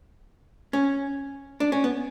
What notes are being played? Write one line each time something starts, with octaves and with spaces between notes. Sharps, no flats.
C#4
D4
C#4
B3